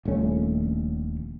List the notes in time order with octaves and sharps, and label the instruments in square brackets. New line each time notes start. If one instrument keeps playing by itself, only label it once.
[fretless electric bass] D#1 A#1 A3 C#4